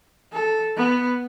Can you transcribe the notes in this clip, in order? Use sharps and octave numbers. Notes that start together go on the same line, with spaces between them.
A4
B3